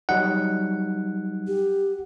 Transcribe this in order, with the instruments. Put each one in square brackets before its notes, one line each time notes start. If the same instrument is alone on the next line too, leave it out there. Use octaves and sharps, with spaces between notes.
[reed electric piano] F#3 G3 D#4 [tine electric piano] F#5
[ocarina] G4